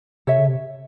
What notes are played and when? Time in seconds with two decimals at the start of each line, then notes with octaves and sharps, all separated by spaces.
0.27 C3 A4 C#5 E5
0.38 C#3
0.48 C3